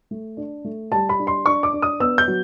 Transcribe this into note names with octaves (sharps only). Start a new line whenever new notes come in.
A3
D4
A3
G3 A5
B5
D4
C6
D4 C#6
D6
D4
D#6
B3 E6
G6
F#3